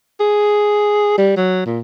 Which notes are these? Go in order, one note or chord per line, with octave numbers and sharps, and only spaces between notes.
G#4
G3
F#3
A#2